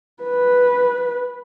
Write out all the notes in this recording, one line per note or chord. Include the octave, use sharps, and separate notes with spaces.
B4